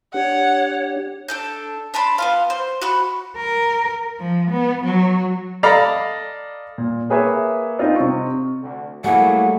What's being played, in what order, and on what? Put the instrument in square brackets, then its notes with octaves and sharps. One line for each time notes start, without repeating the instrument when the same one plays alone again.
[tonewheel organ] D4 G4 [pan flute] C#5 [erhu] F#5
[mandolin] D4 A4 G6
D4 A5 B5 C6
B3 F4 F5
C5
F#4 B5 C#6
[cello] A#4
F3
B3
F#3
[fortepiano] A4 D5 D#5 F5 A#5 B5
[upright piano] A#2
A#3 G#4 B4 C#5 E5
C4 D4 D#4 F4
C3 C4 C#6
[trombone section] D2
[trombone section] F#3 F#4 G#4 [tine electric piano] G3 A#3 E4 [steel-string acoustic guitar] A3 [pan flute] F#5